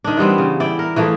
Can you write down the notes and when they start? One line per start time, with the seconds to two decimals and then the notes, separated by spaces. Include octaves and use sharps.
0.04 D#3 D4
0.17 E3 G3 B3 C4
0.38 C#3
0.60 E4 D5 G5
0.79 A#4
0.96 E3 F3 A3 G#4